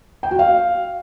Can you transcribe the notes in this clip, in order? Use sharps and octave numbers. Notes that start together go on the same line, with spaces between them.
G5
F#4
F5